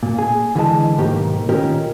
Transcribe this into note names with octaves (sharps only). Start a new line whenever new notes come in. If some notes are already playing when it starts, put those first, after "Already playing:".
A#2
G#4
D3 E3 G#3 A5
B1 G#2 D#3 A#3 G4
A#2 D#3 C#4 G4 A#4